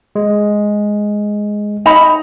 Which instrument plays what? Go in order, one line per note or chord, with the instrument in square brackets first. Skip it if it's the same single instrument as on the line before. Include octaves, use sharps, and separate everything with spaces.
[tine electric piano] G#3
[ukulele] D#4 A#5 B5